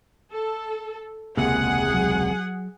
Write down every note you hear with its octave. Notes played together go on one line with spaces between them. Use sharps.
A4
E1 C#2 C3 A#3 G#4 F#5
F#3